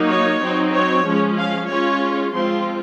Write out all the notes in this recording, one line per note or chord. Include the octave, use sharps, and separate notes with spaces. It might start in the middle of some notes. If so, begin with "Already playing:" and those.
Already playing: F#3 A#3 D#4
C#5
F#3 C4 D#4
C#5
F3 G#3 C#4
F5
G#3 C#4 F4 C#5
F3 G#3 C4 F4 C6